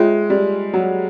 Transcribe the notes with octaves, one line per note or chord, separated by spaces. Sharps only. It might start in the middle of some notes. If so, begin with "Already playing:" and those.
Already playing: G#3 F4 A4 C#5 E5 G5
G3
F#3